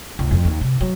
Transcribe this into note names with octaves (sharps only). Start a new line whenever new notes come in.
C#2
F2
D#2
C3
F#3